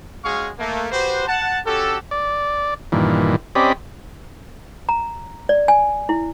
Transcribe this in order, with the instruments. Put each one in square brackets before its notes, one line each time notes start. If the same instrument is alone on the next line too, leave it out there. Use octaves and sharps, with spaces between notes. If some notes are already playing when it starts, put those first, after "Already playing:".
[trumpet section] G#3 C#4 F#4 G#4 F5 C#6
A3 A#3
F#4 G4 B4 C5
F#5 A5
C#4 F#4 G4 A4
[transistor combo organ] D5
G2 A#2 D#3 E3
C4 C#4 G4 D5 D#5 B5
[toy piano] A#5
D5
G#5
E4